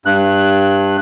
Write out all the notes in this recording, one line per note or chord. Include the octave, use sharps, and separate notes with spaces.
G2 F#6